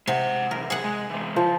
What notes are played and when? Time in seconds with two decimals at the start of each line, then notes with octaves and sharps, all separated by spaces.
0.07 C3 G#3 F#5
0.51 B1 E2 A#4
0.70 G#4 F#5
0.84 G#3
1.10 E3 G#3
1.36 C#3 F3